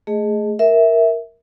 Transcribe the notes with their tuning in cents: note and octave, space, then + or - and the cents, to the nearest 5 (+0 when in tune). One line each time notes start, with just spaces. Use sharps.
A3 +0 G#4 +0 D#5 +0
A#4 +0 E5 -10